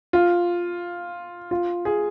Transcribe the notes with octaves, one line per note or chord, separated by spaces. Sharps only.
F4
F4
G#4